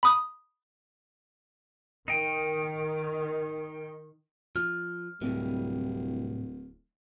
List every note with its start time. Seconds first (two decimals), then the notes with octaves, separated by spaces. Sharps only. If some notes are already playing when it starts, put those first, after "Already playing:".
0.03 B5 D#6
2.08 D#3 D#4 G5
4.56 F3 F6
5.21 D1 A2 C3 E3 G3